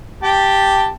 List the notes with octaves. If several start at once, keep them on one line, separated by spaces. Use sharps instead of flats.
G4 G5 A5